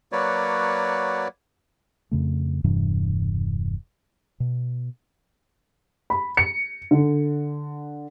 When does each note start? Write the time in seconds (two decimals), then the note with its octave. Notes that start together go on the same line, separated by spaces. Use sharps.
0.12 F#3 A#3 F#4 B4 C#5 D5
2.11 F2 C#3 A3
2.64 E1 G2 C3 E3
4.40 B2
6.10 B5
6.37 C#7
6.91 D3